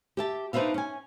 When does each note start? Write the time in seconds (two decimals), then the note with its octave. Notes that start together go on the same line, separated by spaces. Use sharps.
0.17 G4 E5 A5
0.53 D4 D#4 B4 C5 E5 F5
0.74 C#4 G#5